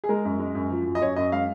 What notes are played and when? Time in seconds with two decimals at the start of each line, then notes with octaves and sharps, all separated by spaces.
0.04 G#4
0.09 G#3 A#4
0.25 F#2
0.40 G#3
0.55 F#2
0.70 F3
0.85 F#2
0.95 D#5
1.01 F#2 C#5
1.16 F#2 D#5
1.32 G#3 F5